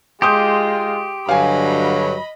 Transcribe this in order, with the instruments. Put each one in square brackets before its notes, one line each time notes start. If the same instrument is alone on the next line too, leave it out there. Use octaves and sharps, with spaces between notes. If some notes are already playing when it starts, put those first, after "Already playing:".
[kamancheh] G#3 F4 [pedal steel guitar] G4 [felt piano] C6 D#6 G6
[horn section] G2 D3 F#3 [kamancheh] D#5 B5 [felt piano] F5 G#5